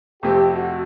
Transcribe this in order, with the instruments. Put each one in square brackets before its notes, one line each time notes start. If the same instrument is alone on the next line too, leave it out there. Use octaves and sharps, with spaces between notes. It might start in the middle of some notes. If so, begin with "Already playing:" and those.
[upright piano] F2 C3 F3 A3 C4 [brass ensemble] G4
[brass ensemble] F#4